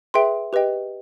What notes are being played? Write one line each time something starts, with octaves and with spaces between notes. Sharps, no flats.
G#4 B4 E5 G5 C6
G4 B4 D#5 G5